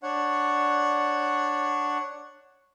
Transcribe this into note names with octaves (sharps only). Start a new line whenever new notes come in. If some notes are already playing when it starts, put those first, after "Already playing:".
D4 C#5 F#5